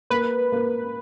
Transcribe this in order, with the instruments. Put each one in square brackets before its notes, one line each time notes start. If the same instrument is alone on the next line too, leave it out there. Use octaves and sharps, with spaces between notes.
[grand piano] A#3 [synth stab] B4
[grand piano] A#3